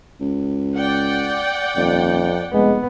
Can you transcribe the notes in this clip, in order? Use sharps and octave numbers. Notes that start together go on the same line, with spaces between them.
C#2
D5 F#5 G5
D#1 F2
F1 G#3 B3